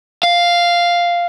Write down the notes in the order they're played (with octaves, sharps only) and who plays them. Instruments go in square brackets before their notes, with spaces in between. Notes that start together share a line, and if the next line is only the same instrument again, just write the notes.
[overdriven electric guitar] F5